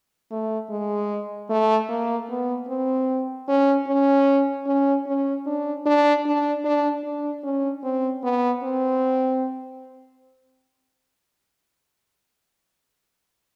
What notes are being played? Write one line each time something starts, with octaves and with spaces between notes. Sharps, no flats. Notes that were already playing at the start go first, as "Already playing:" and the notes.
A3
G#3
A3
A#3
B3
C4
C#4
C#4
C#4
C#4
D4
D4
D4
D4
D4
C#4
C4
B3
C4